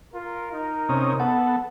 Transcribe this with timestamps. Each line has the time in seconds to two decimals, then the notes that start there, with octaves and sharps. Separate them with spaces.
0.14 F4 A#4
0.53 D#4
0.89 C3 C#4 D#6
1.20 B3 A4 F#5